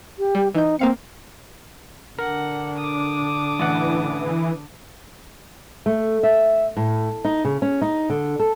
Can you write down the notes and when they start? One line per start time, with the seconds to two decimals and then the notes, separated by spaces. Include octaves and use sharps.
0.18 G4
0.35 G3
0.55 E3 D#4 G6
0.79 A#3 C4 F5 C#7
2.19 D3 D4 A#4 F#5
2.78 D6 D#6
3.59 A1 E3 F#5
5.86 A3
6.23 E5
6.77 A2
7.25 D#4
7.45 C#3
7.62 C#4
7.82 D#4
8.10 D3
8.39 A4